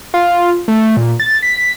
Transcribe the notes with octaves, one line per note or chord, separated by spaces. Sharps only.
F4
A3
A#2
A6
B6